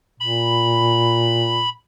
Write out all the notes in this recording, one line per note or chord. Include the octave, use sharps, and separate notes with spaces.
A#2 B5